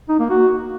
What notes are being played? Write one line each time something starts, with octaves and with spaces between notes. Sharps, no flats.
D#4
A#3
F#4